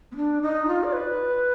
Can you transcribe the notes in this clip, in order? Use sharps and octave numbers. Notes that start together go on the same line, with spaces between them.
B3
D4
D#4
F4
D5
B4